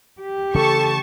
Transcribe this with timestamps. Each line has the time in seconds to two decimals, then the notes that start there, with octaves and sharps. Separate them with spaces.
0.21 G4
0.54 C#3 E3 A3 A4 A5 C#6